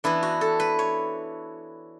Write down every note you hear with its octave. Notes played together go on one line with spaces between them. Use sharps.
E3 B3 D4 E4
F#4
A4
B4
C#5